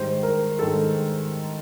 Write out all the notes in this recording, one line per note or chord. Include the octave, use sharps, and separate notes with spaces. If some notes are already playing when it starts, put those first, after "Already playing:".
Already playing: G#2 D#3 G3 C5
A#4
G#2 D#3 G3 A4